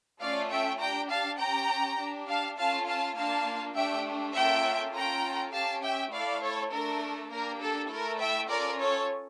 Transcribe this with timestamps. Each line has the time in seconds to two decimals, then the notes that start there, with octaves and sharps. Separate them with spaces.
0.20 A3 C#4 F4 A4 D5 F5
0.51 E5 G5
0.80 D4 G4 G5 A#5
1.09 F5 A5
1.39 C#4 G4 G5 A#5
1.99 D4 G4
2.28 F5 A5
2.58 C#4 F4 A4 F5 A5
2.88 F5 A5
3.16 A#3 D4 F4 F5 A5
3.75 A3 D4 G4 E5 G5
4.34 A#3 C#4 F4 A4 E5 G5
4.94 C#4 F4 A4 G5 A#5
5.53 C#4 G4 F5 A5
5.82 E5 G5
6.12 A3 E4 A4 D5 F5
6.42 A4 C#5
6.71 A3 D4 A4 A#4
7.30 A#3 D4 G4 A#4
7.61 A4
7.90 A3 E4 A4 A#4
8.19 E5 G5
8.49 C#4 F4 A4 A#4 D5
8.79 A4 C#5